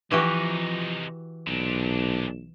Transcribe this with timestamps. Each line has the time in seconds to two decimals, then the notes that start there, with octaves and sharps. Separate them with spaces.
0.11 C3 E3 F3 D#4 F#4 G4
1.47 B1 A#2 D4